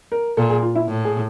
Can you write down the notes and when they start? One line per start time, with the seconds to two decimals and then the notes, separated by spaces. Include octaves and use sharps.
0.12 A#4
0.37 A#2 A4
0.50 G#4
0.62 F4
0.75 E4
0.88 A2
1.05 G#4